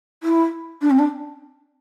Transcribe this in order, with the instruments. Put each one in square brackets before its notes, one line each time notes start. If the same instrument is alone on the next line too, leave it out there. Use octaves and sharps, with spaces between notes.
[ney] E4
D4
C4
D4